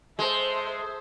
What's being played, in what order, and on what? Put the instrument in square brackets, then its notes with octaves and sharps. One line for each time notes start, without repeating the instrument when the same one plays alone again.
[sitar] G#3 [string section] A4 C5 E5